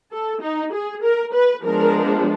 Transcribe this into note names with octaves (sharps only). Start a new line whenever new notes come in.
A4
D#4
G#4
A#4
B4
F3 G#3 B3 D4 A#4